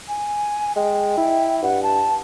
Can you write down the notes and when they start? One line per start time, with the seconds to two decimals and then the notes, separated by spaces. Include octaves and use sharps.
0.08 G#5
0.76 G#3 G5
1.17 E4
1.62 G2 F#5
1.83 A5